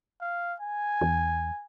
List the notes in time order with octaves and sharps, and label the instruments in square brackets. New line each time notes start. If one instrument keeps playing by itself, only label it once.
[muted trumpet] F5
G#5
[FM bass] E2